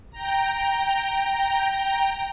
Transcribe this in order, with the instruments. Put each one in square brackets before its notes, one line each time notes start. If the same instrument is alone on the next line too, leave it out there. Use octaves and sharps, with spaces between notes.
[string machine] G5 A#5